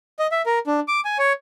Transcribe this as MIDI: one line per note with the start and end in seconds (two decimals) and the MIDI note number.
0.19 0.27 75
0.32 0.42 76
0.46 0.59 70
0.67 0.80 62
0.88 1.01 86
1.05 1.17 80
1.19 1.33 73